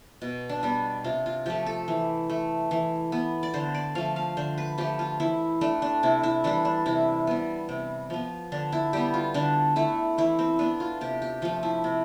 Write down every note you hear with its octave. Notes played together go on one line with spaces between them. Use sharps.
B2
D4
G3 B3
C3 F4
F4
F3 A3 G4
A4
E3
A3
E3
B3
D5
D3 C5
D5
F3 A3 F5
F5
D3 C5
B4
F3 A3 G4
F4
E3 E4
A3 D4
D4
C3 E4
E4
E3 G3 D4
D4
C3 E4
G3 B3
C3
F3 B3
D3 D4
E4
G3 B3 G4
F4
D3 D4
A3 E4
E3 E4
C4
B3 D4
F4
C3 G4
G4
F3 A3 F4
E4
C3